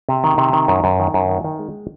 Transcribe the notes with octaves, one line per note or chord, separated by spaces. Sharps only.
C3
D#3
C3
D#3
F#2
F#2
D#3
F#2
D#3
D#3
G#3